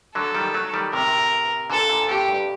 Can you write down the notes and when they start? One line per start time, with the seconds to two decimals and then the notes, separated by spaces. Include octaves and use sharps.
0.15 D3 F#3 A4
0.35 D#3 G3
0.54 F#3 A3
0.74 D#3 G3
0.93 A2 C3 A#4
1.70 A#2 D3 A4
1.89 A#2 D3
2.09 A2 C3 G4
2.28 G2